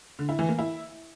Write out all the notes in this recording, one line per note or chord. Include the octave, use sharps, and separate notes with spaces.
D3
E4
E3
A#3
E4